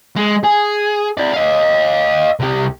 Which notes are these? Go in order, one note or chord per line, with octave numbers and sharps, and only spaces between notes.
G#3
G#4
E4 D5
D#5 F5
C2 G4